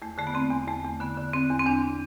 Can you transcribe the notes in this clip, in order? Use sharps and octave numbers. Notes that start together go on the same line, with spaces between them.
E2 A3
D3 A3
B3
D3 C4
E2
E2 A3
E2
D3 B3
D3
D3 C4
E2
C4
E2 D4